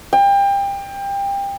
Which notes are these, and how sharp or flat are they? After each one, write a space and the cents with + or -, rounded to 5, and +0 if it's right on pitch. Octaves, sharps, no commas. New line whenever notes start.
G5 +25